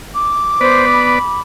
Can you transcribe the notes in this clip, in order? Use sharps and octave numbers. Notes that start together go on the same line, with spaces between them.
D6
B3 B4 C5 D5
B5